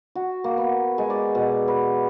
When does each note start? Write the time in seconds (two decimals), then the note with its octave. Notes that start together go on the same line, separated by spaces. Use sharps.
0.15 F#4
0.44 A#3
0.58 B3
0.98 G#3
1.10 D5
1.35 B2
1.68 B4